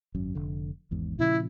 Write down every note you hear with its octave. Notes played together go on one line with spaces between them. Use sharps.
G#1 F#2
F1 D3
G#1 E2 G#2
A#2 C#3 F3 E4